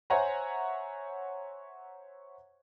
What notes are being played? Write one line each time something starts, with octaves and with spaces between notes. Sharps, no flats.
C5 C#5 E5 F#5 G#5 A#5